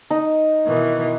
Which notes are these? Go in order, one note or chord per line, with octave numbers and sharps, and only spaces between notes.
D#4
B2 D#3 E3